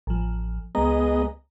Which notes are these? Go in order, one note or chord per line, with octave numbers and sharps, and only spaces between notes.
A1 F3
C#2 G#3 B3 D#5 A#5